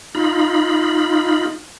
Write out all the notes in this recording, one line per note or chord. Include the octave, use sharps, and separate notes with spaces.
D#4 F4 B5